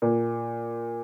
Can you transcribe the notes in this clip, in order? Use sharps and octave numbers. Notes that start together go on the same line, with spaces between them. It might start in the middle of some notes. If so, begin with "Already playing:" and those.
A#2